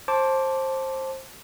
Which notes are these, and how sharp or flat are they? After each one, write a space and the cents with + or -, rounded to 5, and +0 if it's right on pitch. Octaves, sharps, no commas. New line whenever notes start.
C5 +20 A5 +0 D6 -10